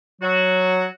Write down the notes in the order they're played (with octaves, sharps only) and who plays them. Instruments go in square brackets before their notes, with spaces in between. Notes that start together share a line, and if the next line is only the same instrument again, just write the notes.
[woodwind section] F#3 F#4